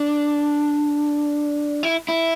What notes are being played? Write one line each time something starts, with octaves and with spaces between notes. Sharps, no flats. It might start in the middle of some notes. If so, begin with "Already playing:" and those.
Already playing: D4
E4
E4